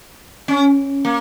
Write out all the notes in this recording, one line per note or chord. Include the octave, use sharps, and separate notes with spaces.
C#4
A#3